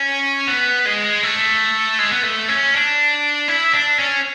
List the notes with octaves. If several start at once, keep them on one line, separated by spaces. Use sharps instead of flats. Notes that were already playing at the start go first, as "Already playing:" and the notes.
Already playing: C#4
B3
G#3
A3
G#3
B3
A3
C#4
D4
E4
D4
C#4